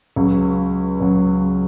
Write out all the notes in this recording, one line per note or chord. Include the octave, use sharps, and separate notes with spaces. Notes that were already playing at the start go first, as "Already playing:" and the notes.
C#2 C#3 F#3
C#2 C#3 F#3